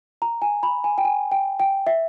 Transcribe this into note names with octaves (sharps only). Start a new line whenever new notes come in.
A#5
G#5
B5
G#5
G5
G#5
G5
G5
E5